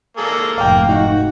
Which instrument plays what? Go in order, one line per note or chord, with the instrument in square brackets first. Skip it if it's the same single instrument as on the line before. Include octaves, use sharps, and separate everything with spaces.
[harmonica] A#3 G#4 A4
[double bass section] F1 G#2 [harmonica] A#3 [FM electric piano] F5 G5
[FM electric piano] D#4 [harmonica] F#4